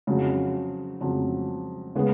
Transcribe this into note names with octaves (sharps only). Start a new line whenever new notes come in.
F2 C#3 F#3
F2 C#3 F#3
C#3 G#3 B3